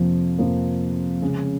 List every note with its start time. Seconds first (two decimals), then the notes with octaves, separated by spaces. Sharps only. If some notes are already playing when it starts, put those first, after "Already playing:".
Already playing: F2 C3 F3 A#3
0.39 F2 C3 F3 A#3
1.22 C#3 G#3 C#4